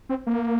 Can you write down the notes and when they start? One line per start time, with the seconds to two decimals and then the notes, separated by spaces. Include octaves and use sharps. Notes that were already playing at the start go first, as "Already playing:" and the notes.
0.09 C4
0.27 A#3